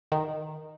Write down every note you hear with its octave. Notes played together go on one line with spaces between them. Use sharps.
D#3